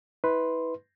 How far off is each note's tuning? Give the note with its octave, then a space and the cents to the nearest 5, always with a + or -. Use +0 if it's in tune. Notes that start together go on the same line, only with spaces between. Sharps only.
E4 -35 B4 +0 C6 +5